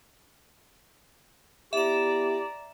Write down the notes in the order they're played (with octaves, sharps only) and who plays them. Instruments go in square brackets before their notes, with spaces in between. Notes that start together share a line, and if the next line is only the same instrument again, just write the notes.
[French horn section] B3 E4 G4 [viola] D5 A#5 [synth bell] E5 E7